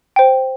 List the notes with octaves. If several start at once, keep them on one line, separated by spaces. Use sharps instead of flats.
C5 G5